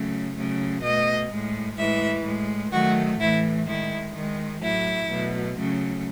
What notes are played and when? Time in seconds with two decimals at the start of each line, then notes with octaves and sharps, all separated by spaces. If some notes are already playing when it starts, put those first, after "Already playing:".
Already playing: C#3 F#3 A3
0.35 C#3 F#3 A3
0.83 B2 A3 D#5
1.31 A2 G#3
1.77 A2 E3 G#3 E5
2.25 A2 G#3
2.72 D#3 F#3 A3 F#4
3.19 A2 E3 A3 E4
3.66 D#3 G#3 E4
4.14 D#3 G#3
4.62 A2 F#3 A3 E4
5.09 B2 F#3 A3
5.56 C#3 F#3 A3